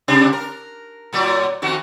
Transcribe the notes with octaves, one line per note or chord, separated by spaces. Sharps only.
C3 G3 D4
A#4
A2 F#3 D5
F2 D#3 F#4